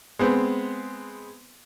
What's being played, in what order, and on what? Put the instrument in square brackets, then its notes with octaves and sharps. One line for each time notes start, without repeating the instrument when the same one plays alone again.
[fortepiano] G#3 B3 C4